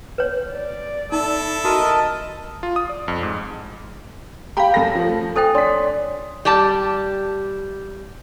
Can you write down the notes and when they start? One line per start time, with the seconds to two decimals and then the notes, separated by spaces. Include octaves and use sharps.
0.18 B4 C#5
0.52 D5
1.12 D#4 E4 A4
1.65 F#4 A#4 D#5 A5 D#6
2.63 F4
2.76 D#6
2.89 D5
3.08 F2
3.23 G#2
4.57 G4 F5 G5 A#5 B5
4.74 F#2 A4 A#6
4.95 F3 A3
5.36 A4 C5 G5 G#5 D#6 A6
5.55 D4 C#5 D5 C6 B6
6.45 G3 G4 A5